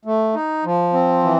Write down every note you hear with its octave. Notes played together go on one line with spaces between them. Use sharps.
A3
D#4
F3
C4
E3